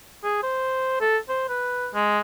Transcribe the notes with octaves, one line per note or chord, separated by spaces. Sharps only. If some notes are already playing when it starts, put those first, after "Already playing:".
G#4
C5
A4
C5
B4
G#3